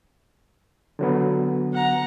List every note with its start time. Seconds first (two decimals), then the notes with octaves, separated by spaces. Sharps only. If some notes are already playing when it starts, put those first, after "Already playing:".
0.99 D3 F#3 B3
1.73 F#5 A#5